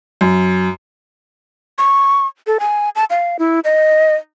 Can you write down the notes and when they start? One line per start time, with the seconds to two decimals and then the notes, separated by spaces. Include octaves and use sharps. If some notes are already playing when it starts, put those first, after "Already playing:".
0.21 F#2
1.78 C#6
2.47 A4
2.60 G#5
2.96 A5
3.10 F5
3.39 E4
3.64 D#5